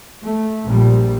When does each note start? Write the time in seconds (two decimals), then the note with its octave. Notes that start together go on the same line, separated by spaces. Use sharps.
0.22 A3
0.66 A#1 A#2 G3